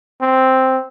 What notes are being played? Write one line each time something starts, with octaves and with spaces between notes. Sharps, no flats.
C4